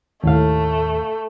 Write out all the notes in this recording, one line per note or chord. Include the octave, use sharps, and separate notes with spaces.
D#2 A2 A3 F5